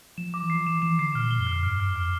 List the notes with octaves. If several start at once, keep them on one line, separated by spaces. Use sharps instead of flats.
F3 E7
D6
E3
C7
F3
E3 E7
E3 E7
D3 C7
A#2 F6
G7
F2
F6
G2 F6
F6
F2
F6